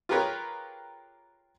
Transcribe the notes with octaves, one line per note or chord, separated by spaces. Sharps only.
F4 G4 G#4 A#4 B4 C#5